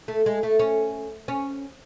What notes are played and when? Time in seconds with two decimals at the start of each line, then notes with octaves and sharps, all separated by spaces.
0.08 A3
0.26 G#3
0.43 A3
0.59 C#4
1.28 C#4